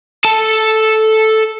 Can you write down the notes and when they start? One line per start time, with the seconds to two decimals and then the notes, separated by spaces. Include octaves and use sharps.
0.24 A4 A5